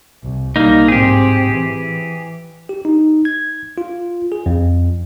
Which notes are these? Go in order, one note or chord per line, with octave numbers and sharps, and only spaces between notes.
C2
B1 G3 A#3 D#4
G#2 C4 G4 G#4
E3
G4
D#4
G#6
F4
G#4
F2